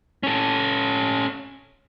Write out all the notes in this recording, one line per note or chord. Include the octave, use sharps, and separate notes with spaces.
C#4 A4